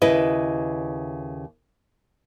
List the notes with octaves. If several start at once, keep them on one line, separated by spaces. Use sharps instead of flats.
D#2 C#3 E4 B4 D#5